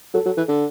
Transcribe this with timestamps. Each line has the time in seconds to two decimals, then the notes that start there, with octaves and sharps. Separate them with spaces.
0.14 F#3 A4
0.25 F#3
0.37 E3
0.48 D3